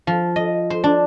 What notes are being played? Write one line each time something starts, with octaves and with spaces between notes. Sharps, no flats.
F3
D#5
C5
D4